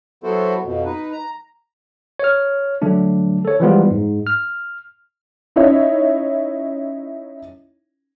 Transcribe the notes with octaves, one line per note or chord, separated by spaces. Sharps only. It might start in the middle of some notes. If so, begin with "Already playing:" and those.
F#3 B3 E4 F#4 A4 C5
F2 B2
D#4 B4
A#5
C#5 F6
D3 F#3 A3 D4
A4 C#5
E3 F3 G3 G#3 B3 F4
G#2
F6
C#4 D#4 E4 C#5